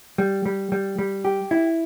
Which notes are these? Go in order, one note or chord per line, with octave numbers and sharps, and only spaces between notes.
G3
G3
G3
G3
G4
E4